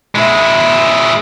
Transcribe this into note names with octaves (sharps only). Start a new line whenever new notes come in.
G#3 E4